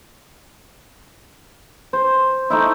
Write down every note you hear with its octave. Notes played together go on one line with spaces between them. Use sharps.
C5
A3 D#4 E4